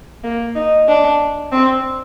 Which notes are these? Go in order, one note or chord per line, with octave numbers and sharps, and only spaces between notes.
A#3
D#4
D4
C4